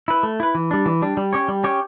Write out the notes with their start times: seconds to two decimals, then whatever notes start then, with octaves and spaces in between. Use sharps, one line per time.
0.08 E4 B4
0.23 A3
0.40 E4 B4
0.55 E3
0.71 G3 D4
0.86 E3
1.02 G3 D4
1.17 G3
1.33 C#4 G4 C#5
1.48 G3
1.64 C#4 G4 C#5